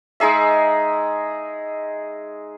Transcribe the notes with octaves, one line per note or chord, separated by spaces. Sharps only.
G#3 D#4 G#4 E5